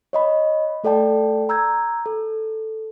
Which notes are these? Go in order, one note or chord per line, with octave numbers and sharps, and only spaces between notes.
C#5 D#5 B5
A3 A4 D5 G5 A5
A#5 E6 G6 G#6
A4